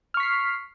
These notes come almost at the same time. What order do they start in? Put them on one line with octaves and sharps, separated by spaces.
F6 C#6 B6 C7